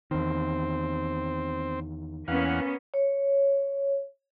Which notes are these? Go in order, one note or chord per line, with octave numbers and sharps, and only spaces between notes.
E2 D#3 C4
E2 A#3 B3 C#4 F5 F#5
C#5